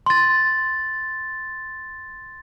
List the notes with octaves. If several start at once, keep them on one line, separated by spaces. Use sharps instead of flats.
C6 A6